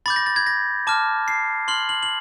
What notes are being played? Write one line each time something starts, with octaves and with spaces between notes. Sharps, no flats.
B5 D6 G6 A6
A#6
A6
G#6
A#6
A5 D6 F6
C7
C6 F6 F#7
F#7
F#7